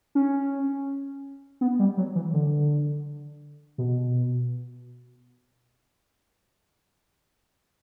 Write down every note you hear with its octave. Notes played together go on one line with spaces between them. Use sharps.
C#4
B3
G3
F#3
E3
D3
B2